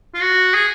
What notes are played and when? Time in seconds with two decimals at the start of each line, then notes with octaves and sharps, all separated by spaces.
0.15 F4
0.21 F#4
0.54 G#4